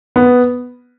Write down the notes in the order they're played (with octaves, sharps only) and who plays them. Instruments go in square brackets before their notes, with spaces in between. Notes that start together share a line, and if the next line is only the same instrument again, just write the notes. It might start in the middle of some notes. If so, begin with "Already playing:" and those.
[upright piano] B3